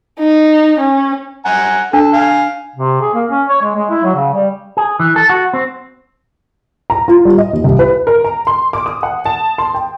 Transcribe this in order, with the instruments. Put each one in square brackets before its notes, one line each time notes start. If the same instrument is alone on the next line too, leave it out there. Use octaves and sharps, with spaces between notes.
[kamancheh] D#4
C#4
[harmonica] F#5 G#5 A#5
[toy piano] D4 [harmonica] A4
[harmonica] F5 G#5
[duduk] C3
G#4
A#3
C#4
C#5
G#3
G#3
E4
F#3
C#3
G3
[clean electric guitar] G#4
E3
A4
F#4
C4
[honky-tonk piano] A#5
F4
G3
D#5
D#2
C2
B4
A#4
A#5
C6
D6
D#6
F#5
A5
C6
G5